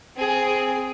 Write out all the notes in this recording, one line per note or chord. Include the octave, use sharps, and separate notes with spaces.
C4 G#4